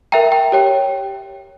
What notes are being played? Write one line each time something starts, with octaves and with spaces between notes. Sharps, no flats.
A#4 E5 G5 A#5
G5
G4 C#5 G5